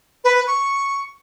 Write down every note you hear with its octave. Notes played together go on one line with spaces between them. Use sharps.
B4
C#6